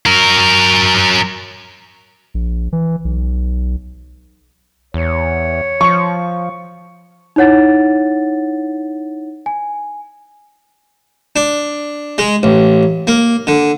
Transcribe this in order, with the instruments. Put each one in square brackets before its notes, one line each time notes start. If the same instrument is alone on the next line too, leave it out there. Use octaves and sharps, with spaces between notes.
[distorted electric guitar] F#3 A#4
[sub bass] A#1
E3
B1
[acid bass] E2 [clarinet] C#5
[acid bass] F3 [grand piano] C#6
[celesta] D#4 E4 C#5 F#5 A6
G#5
[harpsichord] D4
G#3
A1
A#3
D3